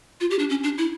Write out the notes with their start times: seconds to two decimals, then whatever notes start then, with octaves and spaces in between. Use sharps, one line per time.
0.21 F4
0.31 G4
0.39 D4
0.50 C#4
0.64 D4
0.78 E4